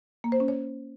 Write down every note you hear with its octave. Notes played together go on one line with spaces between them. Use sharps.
A#3
C5
C#4
C#5